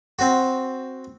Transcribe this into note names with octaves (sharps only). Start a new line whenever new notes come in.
C4 F#4